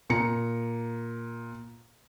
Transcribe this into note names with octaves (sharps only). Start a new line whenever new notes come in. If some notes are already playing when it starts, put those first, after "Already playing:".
A#2 A#5 C#7